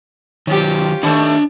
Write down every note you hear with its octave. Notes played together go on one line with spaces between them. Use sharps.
D#3 F#3 C#4 F4 G4
D#3 A3 D4 D#5 A5